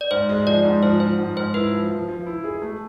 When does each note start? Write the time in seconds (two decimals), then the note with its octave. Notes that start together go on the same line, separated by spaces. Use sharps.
0.01 D5
0.11 G#2 C5
0.29 G#3
0.47 F3 D5
0.65 G#2
0.83 F3 C5
1.00 F3 C5
1.18 G#2
1.37 G#2 C5
1.54 E4 B4
1.73 F3
1.91 F3
2.08 F3
2.26 E4
2.44 G#4
2.62 A3